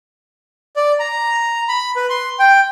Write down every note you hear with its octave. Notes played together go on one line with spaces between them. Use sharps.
D5
A#5
B5
B4
C6
G5